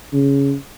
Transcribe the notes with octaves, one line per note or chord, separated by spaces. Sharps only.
C#3